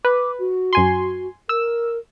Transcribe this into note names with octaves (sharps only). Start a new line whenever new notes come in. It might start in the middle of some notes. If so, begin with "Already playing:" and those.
B4 D6
F#4
F#2 G#5 C6
A#4 E6